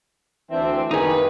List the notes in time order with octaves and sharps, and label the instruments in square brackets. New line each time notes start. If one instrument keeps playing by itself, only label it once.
[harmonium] D2 D4 E5 [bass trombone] E3 [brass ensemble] C4
[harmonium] F#2 E3 [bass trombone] D#3 [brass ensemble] G3 A#3 B4 [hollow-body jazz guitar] D#4 G#4